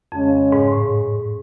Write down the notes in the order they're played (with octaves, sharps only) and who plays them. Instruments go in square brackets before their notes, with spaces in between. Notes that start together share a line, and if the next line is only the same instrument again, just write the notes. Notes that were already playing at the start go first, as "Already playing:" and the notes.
[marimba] F2 [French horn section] C#3 G#3 C#4
[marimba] G#2
A2